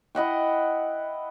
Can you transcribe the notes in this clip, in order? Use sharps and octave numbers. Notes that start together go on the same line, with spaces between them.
E4 D#5 F#5 G5